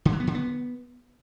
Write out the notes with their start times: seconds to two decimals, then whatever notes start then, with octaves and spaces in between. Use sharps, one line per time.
0.05 D3
0.13 F#3
0.20 B3
0.27 D3
0.35 B3